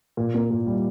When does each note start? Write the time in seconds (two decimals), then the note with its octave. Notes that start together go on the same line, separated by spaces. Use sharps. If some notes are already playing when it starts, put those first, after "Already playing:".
0.17 A#2
0.34 A#3
0.50 A#2
0.66 G3